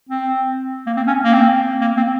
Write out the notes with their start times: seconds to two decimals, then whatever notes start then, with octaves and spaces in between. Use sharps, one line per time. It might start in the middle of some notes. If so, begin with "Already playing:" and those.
0.09 C4
0.87 A#3
0.97 C4
1.07 C#4
1.24 A#3
1.34 C4
1.82 A#3
1.97 C4